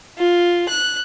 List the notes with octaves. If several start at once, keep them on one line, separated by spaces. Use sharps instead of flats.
F4
F#6